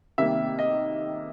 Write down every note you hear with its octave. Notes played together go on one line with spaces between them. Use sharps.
C3 D#3 G3 A#3 E5
D#5